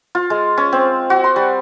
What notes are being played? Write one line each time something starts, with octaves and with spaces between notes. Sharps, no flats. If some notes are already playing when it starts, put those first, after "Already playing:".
F4
G#3
C#4
C4
F#4
C6
G3